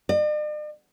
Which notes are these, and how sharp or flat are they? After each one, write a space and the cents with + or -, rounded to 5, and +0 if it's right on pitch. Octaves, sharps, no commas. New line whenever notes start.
D5 +45